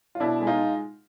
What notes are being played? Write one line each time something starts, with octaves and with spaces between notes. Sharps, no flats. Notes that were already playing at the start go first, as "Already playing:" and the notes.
F4
B2 D4 E4
G#3
D#4 F4